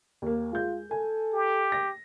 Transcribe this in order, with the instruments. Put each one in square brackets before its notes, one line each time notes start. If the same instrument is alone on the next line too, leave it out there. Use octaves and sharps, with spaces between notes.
[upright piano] D#2 A#3
[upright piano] G#3 G6 [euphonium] F4
[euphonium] A4 [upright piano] G#5
[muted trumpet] G4
[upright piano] A#6